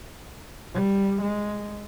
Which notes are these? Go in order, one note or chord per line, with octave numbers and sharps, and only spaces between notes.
G3
G#3